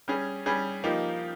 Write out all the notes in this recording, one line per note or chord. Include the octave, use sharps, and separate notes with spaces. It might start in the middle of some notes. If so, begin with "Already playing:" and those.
G3 C#4 G#4
G3 C#4 G#4
F3 A#3 D#4 G4